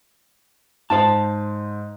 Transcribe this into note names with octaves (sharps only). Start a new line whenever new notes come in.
G#2 C5 F5 A5